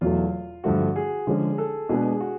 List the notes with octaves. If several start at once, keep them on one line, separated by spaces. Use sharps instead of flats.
E2 B2 F#3 A3 F4
G2 D3 F3 A3 F#4
G#4
D3 F3 G#3 C#4
A4
B2 G#3 B3 D4 G#4
F#4